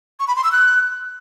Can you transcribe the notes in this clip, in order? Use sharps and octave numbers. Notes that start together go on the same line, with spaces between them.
C#6
B5
C6
E6
F#6